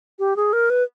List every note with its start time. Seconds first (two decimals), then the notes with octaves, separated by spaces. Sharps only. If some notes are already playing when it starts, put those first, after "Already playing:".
0.19 G4
0.36 G#4
0.53 A#4
0.70 B4